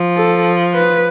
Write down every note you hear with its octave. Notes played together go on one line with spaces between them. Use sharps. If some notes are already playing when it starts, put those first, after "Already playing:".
Already playing: F3
A4
B4